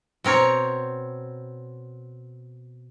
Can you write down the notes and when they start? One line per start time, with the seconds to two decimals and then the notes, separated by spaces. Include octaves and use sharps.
0.24 B2 C4 A#4 C#5